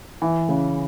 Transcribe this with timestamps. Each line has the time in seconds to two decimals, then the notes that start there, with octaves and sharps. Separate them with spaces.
0.22 E3
0.49 C#3